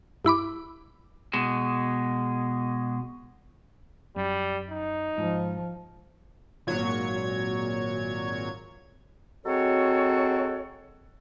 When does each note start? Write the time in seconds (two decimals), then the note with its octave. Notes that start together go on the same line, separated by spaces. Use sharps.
0.25 G2 E4 B5 D6
1.33 B2 G#3
4.16 F#2 G3
4.70 D#4
5.18 G#2 F3
6.67 G#1 A#2 F#3 C#5 G#6
9.46 F#3 G#3 C4 F#4 A4 C#5